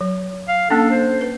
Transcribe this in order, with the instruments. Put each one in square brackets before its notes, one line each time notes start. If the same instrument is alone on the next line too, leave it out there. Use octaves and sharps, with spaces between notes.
[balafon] F#3
[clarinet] F5
[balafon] A#3 C#4 D4 [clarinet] A4
[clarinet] C5
[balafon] B4